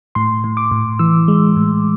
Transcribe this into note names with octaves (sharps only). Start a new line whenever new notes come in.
A2 C6
A2
D6
A2
E3 E6
G#3
A2